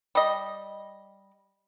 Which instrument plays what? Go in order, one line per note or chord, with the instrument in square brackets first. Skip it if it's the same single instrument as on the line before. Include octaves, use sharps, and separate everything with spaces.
[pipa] G3 D#5